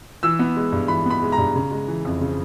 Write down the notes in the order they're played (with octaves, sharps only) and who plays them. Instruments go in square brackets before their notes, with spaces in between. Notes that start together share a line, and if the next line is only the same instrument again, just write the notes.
[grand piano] E3 E6
B3
G#3
G2
E3 B5
B3 B5
G#3
A#5
G2
C#3
G#3
E3
F2
C#3